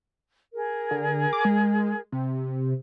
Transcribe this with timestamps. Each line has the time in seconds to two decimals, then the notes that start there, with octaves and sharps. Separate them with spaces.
0.54 G#4 A#4
0.91 D3
1.33 D6
1.45 G#3
2.12 C3